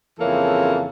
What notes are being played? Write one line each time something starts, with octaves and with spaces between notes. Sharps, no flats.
F2 C#3 E3 A#3 A4 C#5